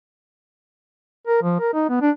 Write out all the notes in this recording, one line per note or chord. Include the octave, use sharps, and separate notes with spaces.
A#4
F3
A#4
D#4
B3
D4